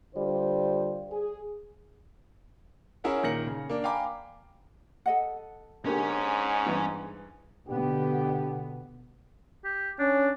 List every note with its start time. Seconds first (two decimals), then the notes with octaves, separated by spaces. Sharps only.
0.15 D3 G3 F4 C5
1.11 G#4
3.04 C#4 E4 G#4 A#4 E5 F#5
3.23 A#2 D#3 A#4 A#6 C#7 F#7
3.47 C#3
3.69 A#3 D4
3.84 F5 G5 G#5 A#5 B5 D6
5.06 A4 D#5 F#5
5.86 G#2 D3 A#3 C#4 G4 C#5
6.66 G2 E3
7.67 B2 D3 B3 D4 G4
9.64 G4
9.99 C#4 D4